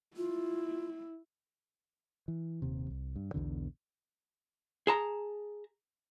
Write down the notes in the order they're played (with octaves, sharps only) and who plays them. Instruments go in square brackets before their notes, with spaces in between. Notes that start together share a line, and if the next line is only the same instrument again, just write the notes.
[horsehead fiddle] E4 [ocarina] F4
[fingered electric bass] E3
D#1 D#2 C3
C2
G2
B1 E2 B2 D3
[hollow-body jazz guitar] G#4 A5 A#5